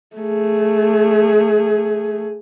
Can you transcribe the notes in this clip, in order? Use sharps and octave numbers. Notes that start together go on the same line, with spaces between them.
A3 G#4